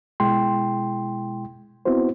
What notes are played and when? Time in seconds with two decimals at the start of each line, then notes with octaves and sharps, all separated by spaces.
0.20 B2 G#3 E4 G5 C6
1.85 B3 C4 E4 F#4 C5